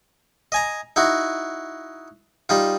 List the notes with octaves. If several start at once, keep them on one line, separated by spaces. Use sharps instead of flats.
D#5 G#5 A#5
D#4 E4 F#4
G3 D#4 F4